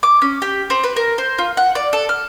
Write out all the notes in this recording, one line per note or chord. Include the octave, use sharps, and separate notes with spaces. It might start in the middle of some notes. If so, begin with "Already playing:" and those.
D6
C#4
G4
C4
B4
A#4
C5
F4
F#5
D5
A4
F6